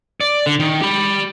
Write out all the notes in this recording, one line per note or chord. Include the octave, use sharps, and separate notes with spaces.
D5
D3
D#3
G4 B5